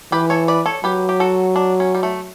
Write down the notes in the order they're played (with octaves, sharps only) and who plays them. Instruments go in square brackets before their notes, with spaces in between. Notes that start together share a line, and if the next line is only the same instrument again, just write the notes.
[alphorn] E3 [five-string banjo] G4 B4
[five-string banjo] A4 C#5
B4 D5
A4 C#5
[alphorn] F#3 [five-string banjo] G4 B4
[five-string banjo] G4
F#4 A4
D4
C#4
G3
A3